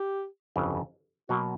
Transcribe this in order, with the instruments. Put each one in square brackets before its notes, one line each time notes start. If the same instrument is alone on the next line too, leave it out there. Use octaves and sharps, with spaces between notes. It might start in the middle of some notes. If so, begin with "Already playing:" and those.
Already playing: [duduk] G4
[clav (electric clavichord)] G1 F2 C#3 E3
[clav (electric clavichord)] B2 F#3 A#3 [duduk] F#4